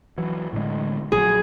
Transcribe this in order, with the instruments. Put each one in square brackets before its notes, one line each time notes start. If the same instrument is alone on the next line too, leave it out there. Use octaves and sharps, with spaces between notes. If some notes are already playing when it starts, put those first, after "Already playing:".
[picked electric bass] E3 F#3
A2 D3 G#3
[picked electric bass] A#1 D3 F#3 [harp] G#4